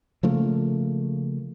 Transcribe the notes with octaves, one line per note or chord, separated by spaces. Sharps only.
C#3 F3 A3 A#3